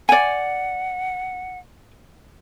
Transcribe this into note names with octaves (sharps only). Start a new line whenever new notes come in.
D5 F#5 G#5